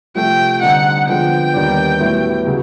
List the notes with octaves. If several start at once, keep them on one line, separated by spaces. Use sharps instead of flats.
C3 F3 A3 G5
D3 G3 C4 D#4 F#5
D3 F3 G#3 B3 G5
D#2 D#3 G3 B3 D4
A2 F#3 B3 E4 G4
C#3 F#3